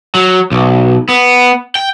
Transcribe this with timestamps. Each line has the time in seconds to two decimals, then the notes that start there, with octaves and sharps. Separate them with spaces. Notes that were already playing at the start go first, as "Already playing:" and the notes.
0.15 F#3
0.52 B1
1.09 B3
1.75 G5